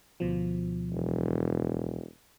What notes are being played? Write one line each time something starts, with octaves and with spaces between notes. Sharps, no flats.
D2 B2 F3
E1